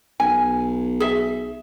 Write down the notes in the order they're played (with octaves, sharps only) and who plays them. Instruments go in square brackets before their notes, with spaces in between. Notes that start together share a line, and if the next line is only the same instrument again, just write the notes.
[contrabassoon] B1 [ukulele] G#5
[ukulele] G#4 E5